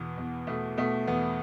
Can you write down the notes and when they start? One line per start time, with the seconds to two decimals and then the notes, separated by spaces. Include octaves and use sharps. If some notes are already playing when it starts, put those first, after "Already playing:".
Already playing: E2 B2 B3
0.18 E2
0.47 B2 A3
0.77 B2 A3
1.07 E2 B3